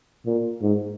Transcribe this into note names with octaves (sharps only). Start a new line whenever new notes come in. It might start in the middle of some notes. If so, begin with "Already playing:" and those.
A#2
G#2